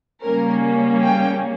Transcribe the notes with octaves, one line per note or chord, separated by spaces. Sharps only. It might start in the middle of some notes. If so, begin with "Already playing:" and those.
C#3 G3 A#3 C#4 A#4
G5